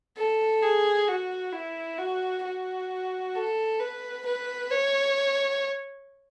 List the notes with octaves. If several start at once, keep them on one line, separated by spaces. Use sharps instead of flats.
A4
G#4
F#4
E4
F#4
F#4
A4
B4
B4
C#5